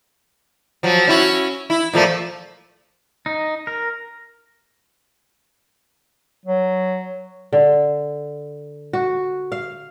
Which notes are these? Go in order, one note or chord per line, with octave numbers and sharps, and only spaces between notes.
F3 F#3
C#4 E4 F#4
E4
A#2 F3 A3
D#4
A#4
F#3
D3
F#4
F5